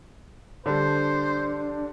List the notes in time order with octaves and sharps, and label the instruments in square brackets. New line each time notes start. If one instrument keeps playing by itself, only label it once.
[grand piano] D3 G3 [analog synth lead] D4 [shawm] C5